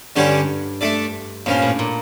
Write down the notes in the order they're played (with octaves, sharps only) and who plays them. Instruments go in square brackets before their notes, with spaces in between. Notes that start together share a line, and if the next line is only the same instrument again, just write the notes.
[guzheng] G2 [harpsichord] D3 G3 C#4 G4 C#5
[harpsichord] A3 D4 A4 D5
[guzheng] G2 [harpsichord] A#2 F3 C#4
[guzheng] A2
A#2